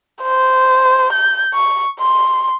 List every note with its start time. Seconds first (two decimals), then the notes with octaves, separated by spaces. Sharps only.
0.23 C5
1.13 G6
1.54 C#6
2.00 C6